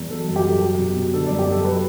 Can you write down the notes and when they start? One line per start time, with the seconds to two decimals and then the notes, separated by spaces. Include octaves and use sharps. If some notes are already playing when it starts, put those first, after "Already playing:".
Already playing: E2
0.10 F#3 A4
0.28 F#2
0.36 G4
0.45 F#2 A4
0.62 F#3 G4
0.79 B2
0.96 B2
1.13 D3 A4
1.26 F#2 D5
1.39 G4
1.47 F#2
1.52 A4
1.65 F#3 B4